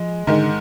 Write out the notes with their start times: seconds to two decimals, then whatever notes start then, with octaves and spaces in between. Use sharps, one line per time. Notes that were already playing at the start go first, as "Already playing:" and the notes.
Already playing: F3 G#3
0.27 G#2 D3 D#3 G#3